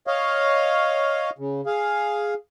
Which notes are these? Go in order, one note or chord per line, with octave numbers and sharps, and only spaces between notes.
C#5 D#5 F5
C#3
G#4 F5